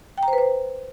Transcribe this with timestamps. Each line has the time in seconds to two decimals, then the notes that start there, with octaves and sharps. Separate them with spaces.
0.18 G5
0.23 A#5
0.28 C5
0.33 B4
0.38 C5